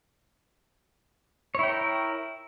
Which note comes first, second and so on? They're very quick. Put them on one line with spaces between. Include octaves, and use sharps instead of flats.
C#5 E4 G5 A#4